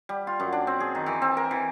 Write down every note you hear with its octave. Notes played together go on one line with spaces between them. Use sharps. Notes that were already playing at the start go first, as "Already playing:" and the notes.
G3
F4
F#2
D4
C4
G#4
D#3
E3
C4
A#4
E3